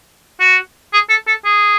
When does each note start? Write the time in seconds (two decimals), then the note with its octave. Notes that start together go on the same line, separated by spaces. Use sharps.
0.40 F#4
0.93 G#4
1.10 A4
1.27 A4
1.45 G#4